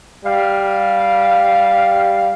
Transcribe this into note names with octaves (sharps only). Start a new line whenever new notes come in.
G3 F5